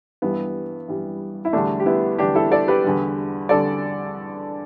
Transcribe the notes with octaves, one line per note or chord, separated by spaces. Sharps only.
G2 E3 G3 B3
G2 E3 G3
E4
E2 D3 G3 A3 D4
G4
B3 E4
E2 D3 G3 D4 G4
E4 A4
A4 D5
G4 B4
E2 D3 G3
D3 G3 A4 D5